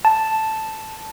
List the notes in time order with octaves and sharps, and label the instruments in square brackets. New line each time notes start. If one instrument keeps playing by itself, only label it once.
[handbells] A5